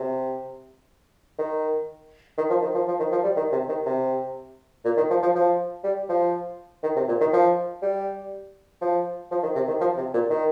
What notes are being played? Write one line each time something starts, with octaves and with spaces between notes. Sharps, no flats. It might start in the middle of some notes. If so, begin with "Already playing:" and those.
Already playing: C3
D#3
D#3
F3
D#3
F3
F3
D#3
F3
G3
D#3
C3
D#3
C3
A#2
D#3
F3
F3
F3
G3
F3
D#3
C3
A#2
D#3
F3
G3
F3
F3
D#3
C3
D#3
F3
C3
A#2
D#3